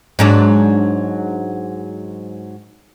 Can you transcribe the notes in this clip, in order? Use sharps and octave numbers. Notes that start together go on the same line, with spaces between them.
G#2 F#3 D4